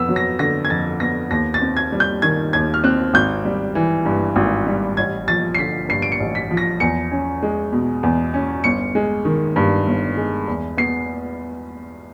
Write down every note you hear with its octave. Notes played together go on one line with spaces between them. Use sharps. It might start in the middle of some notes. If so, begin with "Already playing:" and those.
Already playing: F2 B3 E6
F#3
A#6
D3 A#6
G#6
F2 A6
B3 A#6
D#2 A#6
A6
C4
G#6
G3
G6
D#3 G#6
D#2 G#6
F6
C4 F#6
G#1 G6
G3
E3
G2
G#1
G3
A1 G#6
F3 A6
C7
D3 B6
G2 C7
D7
C#7
A1
B6
F3
A#6
E2 C#7
C#4
G#3
B2
E2
C#4
G1 C#7
G#3
D#3
G2
G1
G#3
E2
B3 C7